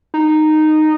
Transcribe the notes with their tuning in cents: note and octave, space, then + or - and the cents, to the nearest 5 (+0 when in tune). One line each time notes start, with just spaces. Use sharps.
D#4 -10